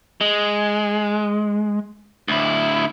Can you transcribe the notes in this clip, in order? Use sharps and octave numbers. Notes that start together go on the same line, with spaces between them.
G#3
D2 E4